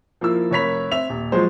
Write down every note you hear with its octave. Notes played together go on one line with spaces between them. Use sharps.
F3 A#3 E4 E6
F1 A#4 C#5 B5 B6 F7
C4 E5 F7
D#1
F3 F#3 G#3 C5